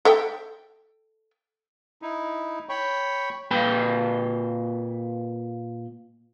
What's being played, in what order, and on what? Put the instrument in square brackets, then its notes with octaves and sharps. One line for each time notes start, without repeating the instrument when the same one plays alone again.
[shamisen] A4 E5 G5
[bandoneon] D#4 E4
C#5 G5 B5 C#6
[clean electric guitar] A#2 B4 G5 B5